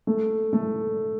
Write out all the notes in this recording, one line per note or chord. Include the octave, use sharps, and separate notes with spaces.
A3
A3